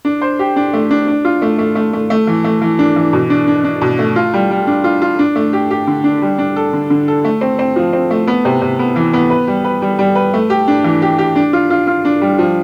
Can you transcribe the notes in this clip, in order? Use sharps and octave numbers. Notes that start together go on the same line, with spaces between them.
D4
C5
G4
D4
A3
D4
D4
F4
A3
A3
A3
A3
A3
E3
A3
E3
D4
E3
B2
D4
D4
D4
B2
A3
F4
G3
G3
D4
F4
F4
D4
A3
G4
G4
D3
D4
G3
D4
A4
D3
D3
A4
A3
C4
C4
F3
C4
A3
B3
C3
C3
B3
E3
B3
B4
G3
B4
G3
G3
B4
A3
G4
D4
E3
G4
G4
D4
F4
F4
F4
D4
G3
F3